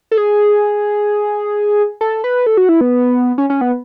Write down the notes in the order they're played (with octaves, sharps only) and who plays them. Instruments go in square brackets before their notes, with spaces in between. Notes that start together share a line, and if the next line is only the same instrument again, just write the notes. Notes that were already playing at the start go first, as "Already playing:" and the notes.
[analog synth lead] A4
G#4
A4
B4
A4
F#4
E4
B3
C#4
C#4
B3